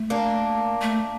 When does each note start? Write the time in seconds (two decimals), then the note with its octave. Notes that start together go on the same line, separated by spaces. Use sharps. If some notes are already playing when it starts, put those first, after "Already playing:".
Already playing: A3
0.10 A#3 D4
0.82 A3